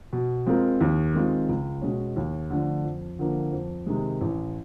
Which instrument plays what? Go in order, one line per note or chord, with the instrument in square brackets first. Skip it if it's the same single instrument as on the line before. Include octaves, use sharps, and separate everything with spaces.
[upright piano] B2
G#3 C4 F4 A#4
D#2
D#3 G#3 C4 F4
C#2
B2 G#3 C#4
D#2
D3 F3 A3 D4
F2
D3 F3 A#3
F2
C3 D#3 G#3
A1